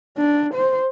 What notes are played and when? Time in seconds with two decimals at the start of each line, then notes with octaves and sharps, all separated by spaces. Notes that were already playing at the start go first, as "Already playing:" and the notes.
0.17 D4
0.54 C5